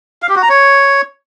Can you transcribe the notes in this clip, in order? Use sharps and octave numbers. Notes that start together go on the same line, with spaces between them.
F5
G4
F#4
A#5
C#5